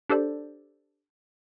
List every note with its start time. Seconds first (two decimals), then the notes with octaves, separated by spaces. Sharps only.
0.09 D4 G4 A4 C5 D5